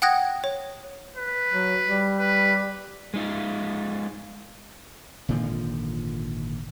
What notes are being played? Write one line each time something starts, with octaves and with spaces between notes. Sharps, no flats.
F#5 G5 D#6 F#6 G#6 A#6
C#5
B4
F#3
G3
B4
G#3 D#4 F4
G#1 A#2 D3 F3